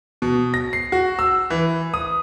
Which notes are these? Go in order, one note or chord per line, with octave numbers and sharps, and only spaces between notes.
B2
A#6
C7
F#4
E6
E3
D#6